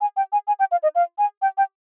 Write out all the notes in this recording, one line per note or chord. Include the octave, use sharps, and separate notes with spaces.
G#5
G5
G#5
G#5
G5
F5
D#5
F5
G#5
G5
G5